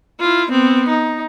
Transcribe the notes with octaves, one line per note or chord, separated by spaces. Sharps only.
E4 F4
B3 C4
D#4